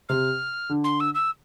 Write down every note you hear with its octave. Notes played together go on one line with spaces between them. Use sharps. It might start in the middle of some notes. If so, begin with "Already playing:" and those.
C3 F6
D3
C6
E6
E6